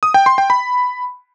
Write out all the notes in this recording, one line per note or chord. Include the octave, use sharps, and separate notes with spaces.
D#6
G5
C6
G5
B5